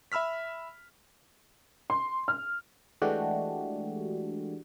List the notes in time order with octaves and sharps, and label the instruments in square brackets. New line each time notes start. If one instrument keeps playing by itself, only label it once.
[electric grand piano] E5 B5 E6 F6 B6
[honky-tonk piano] C6
F6
[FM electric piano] E3 G#3 A3 D4 F#4 G4